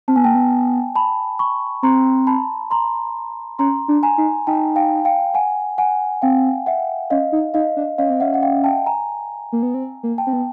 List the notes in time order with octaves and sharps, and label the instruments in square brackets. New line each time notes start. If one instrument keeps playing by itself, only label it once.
[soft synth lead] C4 [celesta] A5
[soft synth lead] B3 [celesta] G#5
[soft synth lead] A#3 [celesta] G5 A5
[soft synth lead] B3
[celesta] A5 B5
B5 C#6
[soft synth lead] C4 [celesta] A#5 C6
[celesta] A5 B5
A#5 C6
[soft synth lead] C#4 [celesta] A#5 C6
[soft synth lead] D4
[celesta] G#5 A#5
[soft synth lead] D#4
[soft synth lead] D#4 [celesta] G5 A5
[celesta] F5 G5
F5 G5
F#5 G#5
F#5 G#5
[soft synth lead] C4 [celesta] F5 G5
[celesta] E5 F#5
[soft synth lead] C#4 [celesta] D#5 F5
[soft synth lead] D#4
[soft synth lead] D#4 [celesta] D#5 F5
[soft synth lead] D4
[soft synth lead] C#4 [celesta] D#5 F5
[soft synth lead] C4
[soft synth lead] C#4 [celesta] E5 F#5
[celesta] F#5
F5 G5
G5 A5
G#5 A#5
[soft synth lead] A#3
B3
C4
A#3
[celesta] G5 A5
[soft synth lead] C4
B3